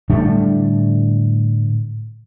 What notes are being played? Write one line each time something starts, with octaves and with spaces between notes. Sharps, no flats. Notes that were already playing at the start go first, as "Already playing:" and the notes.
A2 D3 G3 A3